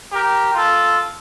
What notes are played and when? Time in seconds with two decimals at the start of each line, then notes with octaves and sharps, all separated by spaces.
0.12 G4 A#4
0.54 F4 A4